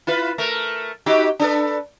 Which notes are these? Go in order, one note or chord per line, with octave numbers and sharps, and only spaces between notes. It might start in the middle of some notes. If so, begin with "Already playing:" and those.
E4 F4 B4
A3 A#4
D#4 F#4 G4
D4 A4 B4